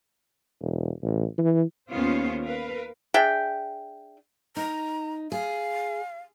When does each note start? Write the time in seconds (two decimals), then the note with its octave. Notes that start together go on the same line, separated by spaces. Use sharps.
0.61 E1
1.03 A1
1.38 E3
1.92 D#2 D#3 B3 C#4 F4 C5
2.44 A#4 B4 F5
3.14 D4 G#4 E5 G5
4.56 D#4 A#5
5.32 G#4 F5